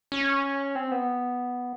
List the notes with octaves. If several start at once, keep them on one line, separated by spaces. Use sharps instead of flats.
C#4
C4
B3